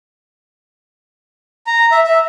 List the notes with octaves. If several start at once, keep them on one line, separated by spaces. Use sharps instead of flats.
A#5
E5
E5